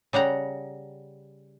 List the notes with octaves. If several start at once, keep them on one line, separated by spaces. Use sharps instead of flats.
C#3 G3 F#5 A#5